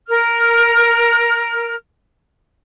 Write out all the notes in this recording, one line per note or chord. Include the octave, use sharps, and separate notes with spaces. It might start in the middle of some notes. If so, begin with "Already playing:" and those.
A#4 F6